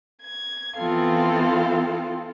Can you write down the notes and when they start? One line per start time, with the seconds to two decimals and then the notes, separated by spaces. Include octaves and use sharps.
0.22 G#6
0.77 E3 B3 C4 F4 A4 F5